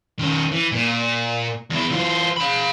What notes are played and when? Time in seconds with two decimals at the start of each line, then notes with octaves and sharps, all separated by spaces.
0.19 D#3 C#4
0.52 E3
0.72 A#2
1.70 E2 E4
1.90 E3 F4
2.37 F5 B5